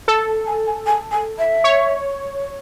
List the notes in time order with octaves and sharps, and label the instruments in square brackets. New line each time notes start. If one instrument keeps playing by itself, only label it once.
[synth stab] A4 [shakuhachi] A5
[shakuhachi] A5
G#5
G#5
G#5
G#5
E5
[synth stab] C#5